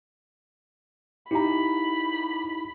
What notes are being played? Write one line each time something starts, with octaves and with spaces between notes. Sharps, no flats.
D#4 E4 G4 A#5 B5